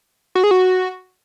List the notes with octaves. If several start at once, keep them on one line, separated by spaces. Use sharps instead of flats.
F#4
G#4
F#4